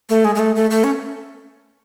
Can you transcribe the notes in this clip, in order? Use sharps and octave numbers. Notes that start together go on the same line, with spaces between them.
A3
G#3
G#3
A3
A3
A3
C#4